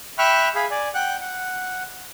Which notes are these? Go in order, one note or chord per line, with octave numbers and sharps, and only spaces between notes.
E5 G5 B5 C#6 F6 F#6
G#4 F5 G#5 B5
D5 G#5
F#5 G5 F#6
F#5